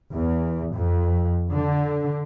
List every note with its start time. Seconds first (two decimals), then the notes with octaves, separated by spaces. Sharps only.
0.14 E2
0.75 F2
1.51 D3